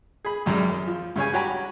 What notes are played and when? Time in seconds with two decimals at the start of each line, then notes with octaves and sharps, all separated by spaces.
0.25 G#4 B5
0.46 C2 F#2 G3 G#3
0.70 F#2
0.87 F3
1.16 G2 C#3 C#5 G#5
1.34 F#4 G4 C#5 G#5 A#5 B5